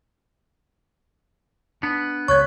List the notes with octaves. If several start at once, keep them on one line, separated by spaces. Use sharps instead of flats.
B3 D4
C#2 C#3 C#5 C#6 F#6 G#6